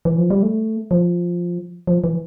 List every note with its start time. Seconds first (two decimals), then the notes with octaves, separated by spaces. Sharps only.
0.05 E3
0.18 F3
0.30 G3
0.43 A3
0.91 F3
1.87 F3
2.04 E3